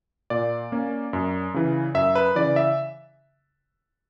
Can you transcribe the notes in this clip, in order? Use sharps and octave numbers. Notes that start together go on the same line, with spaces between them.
A#2 D5
A#3 C#4
F#2
C#3 E3
F#2 E5
B4
C#3 E3 D5
E5